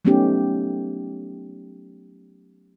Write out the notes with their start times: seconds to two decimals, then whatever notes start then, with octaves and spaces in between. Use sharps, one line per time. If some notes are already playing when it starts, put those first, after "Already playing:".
0.05 F#3 A3 B3 C#4 D#4 G4